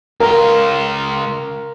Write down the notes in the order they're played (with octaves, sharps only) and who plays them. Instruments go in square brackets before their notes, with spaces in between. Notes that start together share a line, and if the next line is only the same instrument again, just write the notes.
[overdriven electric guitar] C#2 F4 [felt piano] A#4